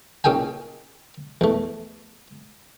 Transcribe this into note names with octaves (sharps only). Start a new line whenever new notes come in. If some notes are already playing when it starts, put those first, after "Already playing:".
A#2 C#3 D#4 G5 G#5
E2 A3